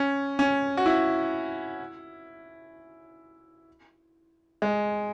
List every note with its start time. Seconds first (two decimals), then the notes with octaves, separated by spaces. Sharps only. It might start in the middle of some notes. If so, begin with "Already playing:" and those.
Already playing: C#4
0.39 C#4
0.77 F#4
0.86 E4
4.62 G#3